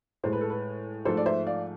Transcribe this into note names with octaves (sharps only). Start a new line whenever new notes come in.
A2 G#3 C5
B4
A4
B4
G#2 F3 A3 A4 C5
D5
C5 E5
D5 F5